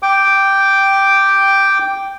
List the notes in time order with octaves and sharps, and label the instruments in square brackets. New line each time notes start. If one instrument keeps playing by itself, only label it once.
[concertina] G5 D6